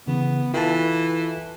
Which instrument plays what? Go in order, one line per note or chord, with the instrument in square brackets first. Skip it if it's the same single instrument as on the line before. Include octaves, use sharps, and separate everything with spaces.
[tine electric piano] C#3 E3 [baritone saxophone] B3
[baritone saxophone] E3 [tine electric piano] F4 A4 A5